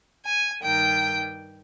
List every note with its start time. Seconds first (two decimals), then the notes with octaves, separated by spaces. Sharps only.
0.25 G#5
0.63 G2 D#3 G5